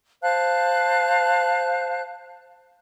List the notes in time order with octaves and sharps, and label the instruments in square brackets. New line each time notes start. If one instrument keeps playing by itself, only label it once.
[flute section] C5 F5 A5 F#6